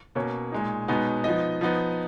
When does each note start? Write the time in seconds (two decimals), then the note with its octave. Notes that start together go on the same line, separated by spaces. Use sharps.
0.15 B2 A#3 C#4 C#5
0.52 A#2 G#3 D#4
0.88 B2 G#3 B3 D#4
1.24 F3 B3 D#4 D#5
1.61 F3 B3 D#4